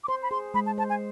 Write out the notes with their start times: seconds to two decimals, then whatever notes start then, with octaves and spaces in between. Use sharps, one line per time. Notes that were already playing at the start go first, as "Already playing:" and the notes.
0.04 D6
0.08 C5 C6
0.23 B5
0.31 G#4 C6
0.54 G#3 B5
0.66 A5
0.78 C5 A5
0.90 G#5